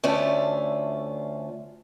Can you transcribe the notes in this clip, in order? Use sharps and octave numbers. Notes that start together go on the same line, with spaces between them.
D2 A3 C#4 F4 D5 E5